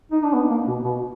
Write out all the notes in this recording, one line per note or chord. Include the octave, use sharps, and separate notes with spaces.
D#4
D4
B3
A#3
B2
B2